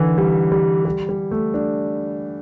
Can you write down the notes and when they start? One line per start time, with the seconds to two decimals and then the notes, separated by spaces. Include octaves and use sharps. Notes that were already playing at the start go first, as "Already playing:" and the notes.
Already playing: D3 E3
0.18 G3
0.52 G3
0.85 G3
1.09 G3
1.31 A3
1.54 D4